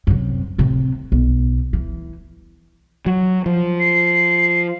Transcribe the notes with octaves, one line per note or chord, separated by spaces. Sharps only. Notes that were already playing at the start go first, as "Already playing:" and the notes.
F#2 C3
A2 C3
B1
E3
F#3
F3
C7